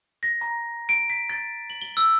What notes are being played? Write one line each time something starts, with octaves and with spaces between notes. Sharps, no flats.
A#6
A#5
D7
B6
A6
F#7
G7
E6